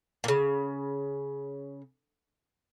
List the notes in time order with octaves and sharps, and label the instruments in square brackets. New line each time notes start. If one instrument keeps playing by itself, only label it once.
[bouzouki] A#2 C#3